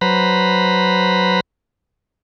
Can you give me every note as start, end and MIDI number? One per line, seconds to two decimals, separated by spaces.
0.01 1.40 54
0.01 1.40 71
0.01 1.40 72
0.01 1.40 82
0.01 1.40 83